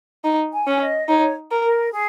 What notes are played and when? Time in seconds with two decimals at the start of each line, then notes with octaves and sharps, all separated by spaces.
0.24 D#4
0.53 G#5
0.67 C#4
0.81 D#5
1.09 D#4 C#5
1.51 A#4
1.65 A#4
1.93 G#4